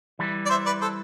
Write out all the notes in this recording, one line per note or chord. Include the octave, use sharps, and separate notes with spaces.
E3 G3
D5
C5 E5
B4 D5
A4 C5